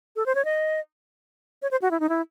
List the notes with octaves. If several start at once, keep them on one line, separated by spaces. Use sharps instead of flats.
A4
C5
C#5
D#5
C#5
C5
F#4
E4
D#4
E4